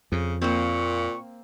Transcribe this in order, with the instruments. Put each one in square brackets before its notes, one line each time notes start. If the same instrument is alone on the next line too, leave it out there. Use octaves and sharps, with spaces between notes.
[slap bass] F2 [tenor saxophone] C#3
[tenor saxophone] A#2 [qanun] A#3 C4 [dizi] C#6